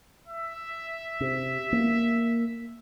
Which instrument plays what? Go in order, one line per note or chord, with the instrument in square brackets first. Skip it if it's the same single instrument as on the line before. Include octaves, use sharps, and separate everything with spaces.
[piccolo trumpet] E5
[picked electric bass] C3
A#3